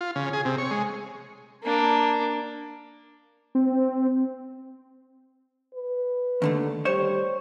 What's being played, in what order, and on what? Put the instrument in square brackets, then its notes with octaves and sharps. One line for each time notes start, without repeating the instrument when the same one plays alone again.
[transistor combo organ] F4
C#3
G#4
C3
C#5
G#3
[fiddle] A#3 D4
[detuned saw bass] C4
[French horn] B4
[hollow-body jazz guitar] D#2 D3 A3
[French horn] G3 [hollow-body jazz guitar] C5 C#5